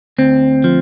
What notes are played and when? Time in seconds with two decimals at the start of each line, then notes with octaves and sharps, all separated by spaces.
0.18 D2 C4
0.64 F3